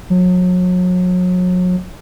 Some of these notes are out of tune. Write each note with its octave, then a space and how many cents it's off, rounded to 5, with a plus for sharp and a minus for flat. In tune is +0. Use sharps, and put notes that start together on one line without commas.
F#3 -35